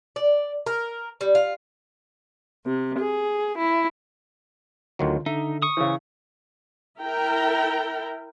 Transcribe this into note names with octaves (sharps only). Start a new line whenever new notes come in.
D5
A#4
G3
F4
C3
G#4
E4
D2 D3 D#3 F#3 F4
D3 D#4 E5
C#6 D#6
C#3 E3 C5
E4 A#4 G5